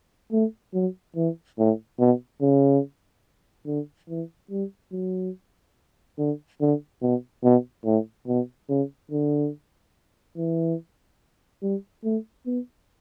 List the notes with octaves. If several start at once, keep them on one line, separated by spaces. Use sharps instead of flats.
A3
F#3
E3
A2
B2
C#3
D3
E3
G3
F#3
D3
D3
B2
B2
A2
B2
C#3
D3
E3
G3
A3
B3